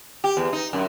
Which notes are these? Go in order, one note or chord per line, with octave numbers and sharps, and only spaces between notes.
G4
E2
D#4
F#2